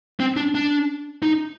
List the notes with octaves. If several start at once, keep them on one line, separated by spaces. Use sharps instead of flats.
C4
D4
D4
D#4